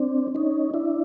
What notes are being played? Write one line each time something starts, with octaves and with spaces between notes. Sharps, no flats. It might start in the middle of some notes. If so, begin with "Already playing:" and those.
Already playing: C4 D4
C#4 D#4
D4 E4